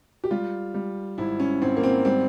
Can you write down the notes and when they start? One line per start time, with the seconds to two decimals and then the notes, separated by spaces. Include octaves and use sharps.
0.24 G4
0.31 G3 F4
0.74 G3
1.18 G#1 E4
1.40 C#4
1.62 G#1 C4
1.77 A#3
1.83 C4
2.05 G3 C4